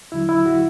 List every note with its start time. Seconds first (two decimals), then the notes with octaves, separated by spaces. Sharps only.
0.12 E2 D3 F#3 E4
0.29 E4
0.46 F#4